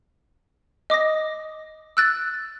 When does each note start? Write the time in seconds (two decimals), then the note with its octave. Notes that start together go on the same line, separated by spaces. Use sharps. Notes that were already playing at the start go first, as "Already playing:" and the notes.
0.90 D#5 D6 D#6 A#6
1.97 E6 F#6 A6